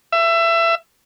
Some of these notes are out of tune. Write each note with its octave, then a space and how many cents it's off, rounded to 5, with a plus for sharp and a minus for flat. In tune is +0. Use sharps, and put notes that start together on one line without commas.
E5 +25